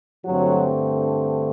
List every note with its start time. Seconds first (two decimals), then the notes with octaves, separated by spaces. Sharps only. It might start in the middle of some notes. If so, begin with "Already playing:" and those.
0.25 G2 D3 F#3 A3 C4 F#4